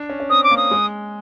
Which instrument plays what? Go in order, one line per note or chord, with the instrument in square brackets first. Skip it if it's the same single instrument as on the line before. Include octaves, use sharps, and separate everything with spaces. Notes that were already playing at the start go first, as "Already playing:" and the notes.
Already playing: [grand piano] D4
C#4
C#4
[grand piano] C4 [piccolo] D#6
[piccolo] D6
[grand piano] A#3
[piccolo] D#6
[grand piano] G#3